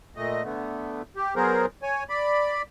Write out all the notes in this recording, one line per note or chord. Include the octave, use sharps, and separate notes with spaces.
A#2 A3 D#5
D3 A3 B3
G4
F#3 B3 G#4 A#4 C5
C#5 G#5
D5 B5